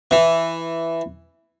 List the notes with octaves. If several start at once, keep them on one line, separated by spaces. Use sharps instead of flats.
E3